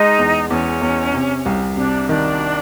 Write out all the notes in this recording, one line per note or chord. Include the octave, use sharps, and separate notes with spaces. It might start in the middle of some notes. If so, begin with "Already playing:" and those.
Already playing: G#3 D#4
E2
E2 C#4
E2
C3
C2
C3 D4
D#3 D4